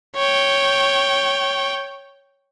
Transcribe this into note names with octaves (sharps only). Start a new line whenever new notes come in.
C#5 G5